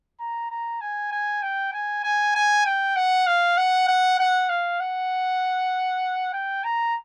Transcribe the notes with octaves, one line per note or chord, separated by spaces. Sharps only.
A#5
A#5
G#5
G#5
G5
G#5
G#5
G#5
G5
F#5
F5
F#5
F#5
F#5
F5
F#5
G5
A#5